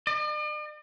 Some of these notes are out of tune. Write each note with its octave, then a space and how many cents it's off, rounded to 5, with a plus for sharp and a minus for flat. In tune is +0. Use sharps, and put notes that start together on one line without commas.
D5 +45